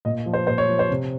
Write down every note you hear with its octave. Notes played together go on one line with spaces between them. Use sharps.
A#2 D#5
F3
C5
A#2 C5
C#5
F3
C5
C3